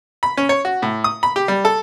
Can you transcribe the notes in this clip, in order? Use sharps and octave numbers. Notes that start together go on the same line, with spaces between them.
B5
C#4
C#5
F#4
A2
D#6
B5
G4
G3
A4